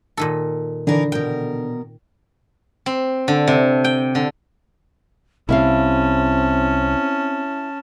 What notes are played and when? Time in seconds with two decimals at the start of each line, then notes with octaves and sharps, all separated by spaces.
0.17 A#2 D#3 A4
0.87 D3 E3 D4 D#4 A#4
1.12 B2 A#4 G5
2.86 C4
3.28 D3
3.47 C3
3.84 G5
4.15 D3
5.49 C2 C3 C4 C#4 E4 E5 F5 A5